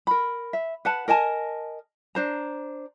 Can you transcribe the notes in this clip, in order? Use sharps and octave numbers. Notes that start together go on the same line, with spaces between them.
A#4 B5
E5
B4 F#5 A5
A#4 D#5 G#5 A5
D4 C5 A#5